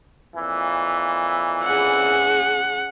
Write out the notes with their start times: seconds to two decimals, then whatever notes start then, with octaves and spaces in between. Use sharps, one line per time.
0.34 F2 A#2 E3
1.64 C#4 G#4 F#5